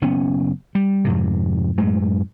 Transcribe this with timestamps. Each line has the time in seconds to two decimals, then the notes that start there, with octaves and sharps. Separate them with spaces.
0.02 F#1 B3 C#4
0.75 G3
1.05 F2 G#2 C3
1.77 F#2 A2 G#3 A3